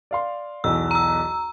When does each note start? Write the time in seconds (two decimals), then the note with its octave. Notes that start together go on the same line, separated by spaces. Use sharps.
0.11 D5 F5 C6
0.64 B1 E2 E6
0.91 A#5 E6